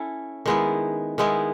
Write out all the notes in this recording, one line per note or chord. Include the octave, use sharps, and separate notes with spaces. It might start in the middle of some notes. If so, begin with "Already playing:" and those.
Already playing: C#4 E4 A4
D#3 G#3 B3 E4
D#3 G#3 B3 E4